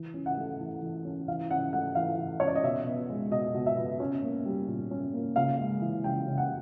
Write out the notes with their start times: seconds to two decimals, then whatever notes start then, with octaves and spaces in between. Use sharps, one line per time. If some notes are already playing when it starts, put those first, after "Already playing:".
Already playing: E3
0.14 C#4
0.26 F#5
0.37 A3
0.60 E3
0.82 E3
1.05 C#4
1.28 E3 F5
1.51 C#4 F#5
1.73 A3 F#5
1.95 E3 F5
2.18 E3
2.40 C#4 C#5
2.48 D5
2.55 D#5
2.63 B2 E5
2.86 B3
3.10 G#3
3.31 B2 D#5
3.54 B2
3.66 E5
3.77 B3
4.00 C#4
4.23 A#3
4.45 G3
4.68 A#2
4.91 C#4
5.14 A#3
5.36 C#3 F5
5.59 G#3
5.81 E3
6.04 C#3 G5
6.27 C#3
6.38 F#5